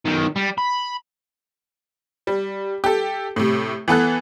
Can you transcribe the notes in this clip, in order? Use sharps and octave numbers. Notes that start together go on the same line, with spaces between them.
B1 D#3
G3
B5
G3
G4 A4
A2 C3
E3 B3 A4 F#6